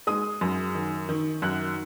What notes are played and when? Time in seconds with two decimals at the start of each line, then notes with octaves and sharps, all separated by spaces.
0.07 G#3 D#6
0.41 F#2
0.75 D#3
1.09 D#3
1.42 F#2 F#6